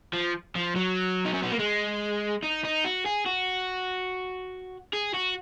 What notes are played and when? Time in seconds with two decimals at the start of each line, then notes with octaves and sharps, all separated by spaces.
0.13 F3
0.55 F3
0.76 F#3
1.25 D#4
1.33 C#4
1.42 B3
1.51 A#3
1.59 G#3
2.43 D#4
2.64 D#4
2.84 F#4
3.06 G#4
3.26 F#4
4.93 G#4
5.14 F#4